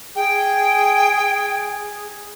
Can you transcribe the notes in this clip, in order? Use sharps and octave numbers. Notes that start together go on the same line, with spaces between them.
G#4 G5